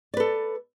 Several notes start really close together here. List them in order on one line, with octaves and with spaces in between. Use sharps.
D5 B4 A4